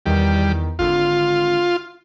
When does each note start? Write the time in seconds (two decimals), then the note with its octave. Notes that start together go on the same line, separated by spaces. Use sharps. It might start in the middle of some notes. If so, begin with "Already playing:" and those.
0.06 E2 D#3 G3
0.79 G#1 D3 F4